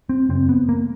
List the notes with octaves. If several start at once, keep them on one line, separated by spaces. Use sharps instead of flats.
C4
F#2 C#3 C4
B3
A#3